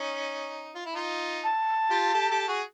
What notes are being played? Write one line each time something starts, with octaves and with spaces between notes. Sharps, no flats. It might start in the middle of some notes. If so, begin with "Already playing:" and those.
Already playing: C#4 D#4
F4
E4
D#4 F4
A5
F4 G4
G4 A4
G4 A4
F#4 G#4